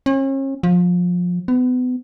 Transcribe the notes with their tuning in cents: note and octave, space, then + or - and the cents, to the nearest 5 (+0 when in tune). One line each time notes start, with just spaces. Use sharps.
C#4 -40
F3 +25
B3 +30